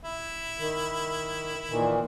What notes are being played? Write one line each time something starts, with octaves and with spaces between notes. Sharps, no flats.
E4
D#3
A#2 D#3 E3